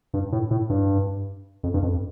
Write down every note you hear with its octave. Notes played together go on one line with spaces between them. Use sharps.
G2
A2
A2
G2
F2
G2
F2